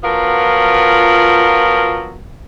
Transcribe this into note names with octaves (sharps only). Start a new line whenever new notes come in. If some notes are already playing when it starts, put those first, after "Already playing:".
F3 F#3 B3 F4 A#4